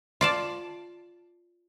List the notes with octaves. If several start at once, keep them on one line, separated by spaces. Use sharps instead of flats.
F4 D5 A5